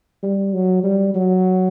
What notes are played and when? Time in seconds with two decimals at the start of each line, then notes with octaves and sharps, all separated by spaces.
0.23 G3
0.53 F#3
0.84 G3
1.15 F#3